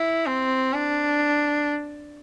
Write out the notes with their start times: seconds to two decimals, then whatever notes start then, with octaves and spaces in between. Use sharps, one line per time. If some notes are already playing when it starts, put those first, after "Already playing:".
Already playing: E4
0.26 C4
0.73 D4